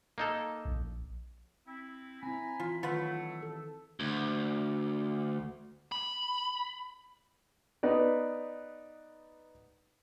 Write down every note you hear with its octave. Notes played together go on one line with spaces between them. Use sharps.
A#3 D#4 A4
A#1
C4 E4
C4 E4 G#5 A#5 B5
E3 F4
D#3 F#3 A3 F4 B4 F#5
A4
D2
B5
B3 D#4 B4 D5